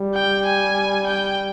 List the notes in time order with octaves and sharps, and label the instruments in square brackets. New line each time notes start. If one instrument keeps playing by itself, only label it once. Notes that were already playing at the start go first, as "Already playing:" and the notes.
Already playing: [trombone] G3
[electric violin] G5
G#5
G5